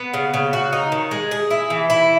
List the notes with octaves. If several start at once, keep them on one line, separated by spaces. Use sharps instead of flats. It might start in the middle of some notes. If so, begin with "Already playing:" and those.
Already playing: B3
C#3
C#3
F#4
D#4
D#3
G#3
G#4
E4
E3
E4